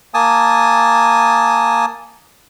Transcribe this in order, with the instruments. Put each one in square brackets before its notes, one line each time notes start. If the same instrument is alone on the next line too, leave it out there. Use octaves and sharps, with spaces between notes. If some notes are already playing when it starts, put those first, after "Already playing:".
[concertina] A#3 G#5 A5 D#6